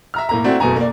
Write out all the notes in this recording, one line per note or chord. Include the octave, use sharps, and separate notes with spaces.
E5 A#5 F6
A2 A#3 A#5
A3 C4 D4 E4 F#4
F#1 B2 A3 G#5 A#5
A#3 D5